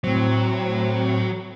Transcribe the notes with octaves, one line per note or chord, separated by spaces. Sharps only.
A2 F#3 C4